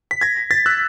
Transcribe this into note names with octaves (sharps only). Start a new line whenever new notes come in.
B6
G#6 A#6
A6 B6
E6 F#6